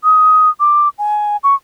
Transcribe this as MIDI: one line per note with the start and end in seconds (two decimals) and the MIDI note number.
0.04 0.49 87
0.60 0.89 86
0.99 1.37 80
1.44 1.55 85